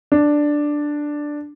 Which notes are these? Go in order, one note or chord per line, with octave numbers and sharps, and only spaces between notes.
D4